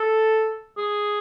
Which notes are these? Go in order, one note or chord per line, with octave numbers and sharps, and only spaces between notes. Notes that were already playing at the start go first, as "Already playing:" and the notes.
Already playing: A4
G#4